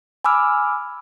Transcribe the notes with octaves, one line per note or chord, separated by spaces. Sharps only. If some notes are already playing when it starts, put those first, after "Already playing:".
G#5 B5 D6 E6 F6